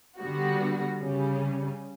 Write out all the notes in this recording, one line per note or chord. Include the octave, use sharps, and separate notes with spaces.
D3 G3 B3 F#4
C#3 G3 C#4